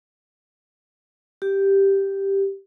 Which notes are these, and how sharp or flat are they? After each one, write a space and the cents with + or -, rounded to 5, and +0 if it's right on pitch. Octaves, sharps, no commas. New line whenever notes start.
G4 +0